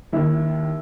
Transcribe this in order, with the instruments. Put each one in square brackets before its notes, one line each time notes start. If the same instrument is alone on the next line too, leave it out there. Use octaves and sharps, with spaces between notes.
[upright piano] D#2 D#3 E4